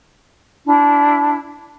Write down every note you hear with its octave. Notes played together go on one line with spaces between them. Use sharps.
D4 E4